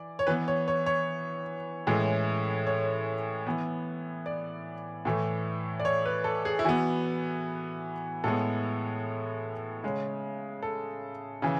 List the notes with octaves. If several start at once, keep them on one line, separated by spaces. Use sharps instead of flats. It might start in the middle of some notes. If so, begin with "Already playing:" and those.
Already playing: E3 D5
C#5
E3 B3 B4
C#5
C#5
C#5
A2 E3 G#3 C#4
C#5
E3 B3
D5
A2 E3 A3
D5
C#5
B4
A4
G#4
E4
E3 B3 F#4
A2 G#3 B3 A4
C#3 G#3 C#4
A4
C#3 E3